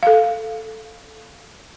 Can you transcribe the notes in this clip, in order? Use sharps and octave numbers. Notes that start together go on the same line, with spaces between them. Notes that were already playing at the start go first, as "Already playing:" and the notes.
A4 F5